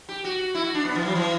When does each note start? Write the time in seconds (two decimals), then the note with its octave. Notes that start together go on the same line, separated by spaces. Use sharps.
0.09 G4
0.24 F#4
0.55 E4
0.64 F#4
0.74 D4
0.85 B3
0.95 E3
1.05 F#3
1.15 E3